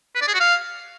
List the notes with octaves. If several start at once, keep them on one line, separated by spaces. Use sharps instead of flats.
B4
D5
G#4
F#4
F5